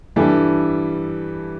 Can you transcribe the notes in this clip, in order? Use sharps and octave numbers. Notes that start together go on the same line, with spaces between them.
G2 E3 G3 E4 A4